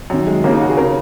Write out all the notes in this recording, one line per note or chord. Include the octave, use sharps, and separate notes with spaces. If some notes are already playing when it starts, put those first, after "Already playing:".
F#2 D#3
G#3
D#2 C#3 A#3
D#4
F#4
G#4
C#3 A#4